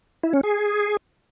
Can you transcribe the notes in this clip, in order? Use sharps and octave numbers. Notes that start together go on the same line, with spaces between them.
E4
C#4
G#4